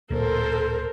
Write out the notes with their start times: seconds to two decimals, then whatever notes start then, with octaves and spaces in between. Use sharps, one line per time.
0.11 D1 A#2 A4 A#4 C5